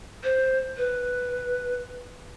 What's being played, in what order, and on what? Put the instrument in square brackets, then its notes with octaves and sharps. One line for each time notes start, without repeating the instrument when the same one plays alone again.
[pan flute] C5
B4